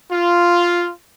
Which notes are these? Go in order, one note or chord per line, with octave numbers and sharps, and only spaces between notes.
F4